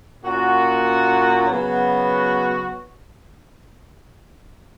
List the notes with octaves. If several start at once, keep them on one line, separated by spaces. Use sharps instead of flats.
A#2 A#3 C#4 F#4
C#3 F#3 B3 F#4